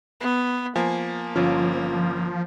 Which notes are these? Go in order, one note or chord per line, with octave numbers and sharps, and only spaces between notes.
B3
F3 A#3 G#5
G1 F3 C#4 F4